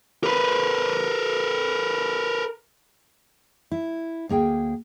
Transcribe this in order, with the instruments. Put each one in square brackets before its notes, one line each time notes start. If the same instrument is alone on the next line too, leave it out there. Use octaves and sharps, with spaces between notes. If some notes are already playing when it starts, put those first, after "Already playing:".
[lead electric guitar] A#4 B4
[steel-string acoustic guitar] E4
D2 A#3 G#4 G5